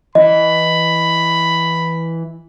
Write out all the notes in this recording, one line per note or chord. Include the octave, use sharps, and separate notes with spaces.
E3 D#5 B5